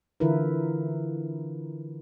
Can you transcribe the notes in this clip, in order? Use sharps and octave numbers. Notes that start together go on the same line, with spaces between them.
D3 E3 E4 F4 A#4 B4